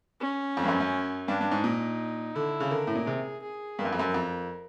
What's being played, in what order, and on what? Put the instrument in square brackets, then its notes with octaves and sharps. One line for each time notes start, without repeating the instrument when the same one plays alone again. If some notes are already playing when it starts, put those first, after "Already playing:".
[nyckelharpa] C#4
[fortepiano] F2
G2
F#2
F#2
[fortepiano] G2 [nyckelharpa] D4
[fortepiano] G2
G#2
[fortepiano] A#2 [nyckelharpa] D#4
[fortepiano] D3 [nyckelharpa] E4
[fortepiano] C#3
[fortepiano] D3 [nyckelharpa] A#4
[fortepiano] A2
A#2
[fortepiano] C3 [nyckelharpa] G#4
[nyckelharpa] G#4
[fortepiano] G2 [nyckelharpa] A#4
[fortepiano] F#2
F2
F#2
F2